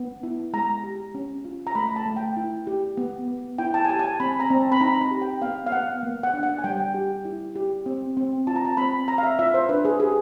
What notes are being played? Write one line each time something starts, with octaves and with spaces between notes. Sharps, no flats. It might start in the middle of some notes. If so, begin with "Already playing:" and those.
Already playing: B3
E4
G#3 A#5
G4
C#4
F4
A#5
A3 B5
A5
A3
G5
E4
G4
B3
B3
E4 G5
A5
G#5
G4 A5
G#5
A5
C4 B5
A#5
C4
A5
B5
D#4 A#5
B5
G4
G5
B3 F5
F5
B3 F#5
A#3
F#5
D4
F#5
G#5
G3 G5
G4
E4
G4
C4
C4
F4 A5
A#5
A5
C4 B5
C4 A#5
F5
E5
F4 E5
C5
D4 B4
G#4
G4 G#4